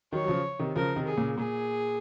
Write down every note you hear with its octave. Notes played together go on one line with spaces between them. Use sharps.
D#3 F#3 C#5
F#3
C#3 F3
C3 D#3
C#3 F3 A#4
C3 D#3
G#4
A#2 C#3
A#2 G#4